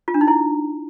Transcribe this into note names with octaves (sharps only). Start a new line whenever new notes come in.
F4
D4
D#4
E4